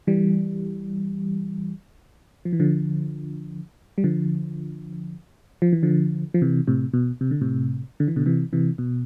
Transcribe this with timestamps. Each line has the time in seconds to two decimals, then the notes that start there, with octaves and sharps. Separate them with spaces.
0.07 E3 G3
2.45 F3
2.53 E3
2.60 D3 F3
3.98 G3
4.04 D3 F3
5.62 F3
5.72 E3
5.83 D3 F3
6.34 F3
6.42 C3 E3
6.67 A2 C3
6.94 B2
7.21 C3
7.31 D3
7.41 A2 C3
8.00 D3
8.08 E3
8.16 B2 D3
8.26 C3 E3
8.53 C3 E3
8.78 B2